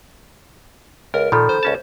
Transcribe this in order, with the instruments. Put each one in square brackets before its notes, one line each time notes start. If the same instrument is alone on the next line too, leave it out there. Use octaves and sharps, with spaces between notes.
[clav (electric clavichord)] C#2 [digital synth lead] A#4
[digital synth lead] A#2 [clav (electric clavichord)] D#3 F3 [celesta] A4 B5
[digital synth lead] C5
[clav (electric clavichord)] C#2 C#4 A5